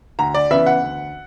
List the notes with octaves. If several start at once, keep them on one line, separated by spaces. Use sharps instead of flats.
D2 A#5
D5
C#3 E3 B3 E5
F#5
D2